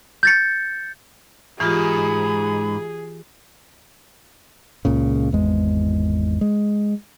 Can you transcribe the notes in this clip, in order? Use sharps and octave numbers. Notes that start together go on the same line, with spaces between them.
G6 A6 C#7
G#2 E3 F4 G4 G#4 B5
C#2 A#2 C#3
G#1 E2 G#3
G#3